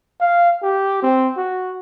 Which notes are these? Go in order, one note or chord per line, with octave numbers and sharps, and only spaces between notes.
F5
G4
C4
F#4